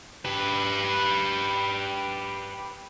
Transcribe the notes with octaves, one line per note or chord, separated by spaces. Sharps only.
G4 B4